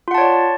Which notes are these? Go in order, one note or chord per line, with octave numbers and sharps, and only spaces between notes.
F4 C#5 D5 F#5 A5